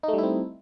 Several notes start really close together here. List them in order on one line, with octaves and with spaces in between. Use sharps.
D#4 A3 G3 E4 C4